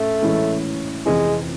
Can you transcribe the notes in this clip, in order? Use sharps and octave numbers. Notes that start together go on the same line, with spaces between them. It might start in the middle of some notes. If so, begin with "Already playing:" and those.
Already playing: A2 A3 C#4
A2 E3 G#3 C#4 E4
F2 C3 E3 G#3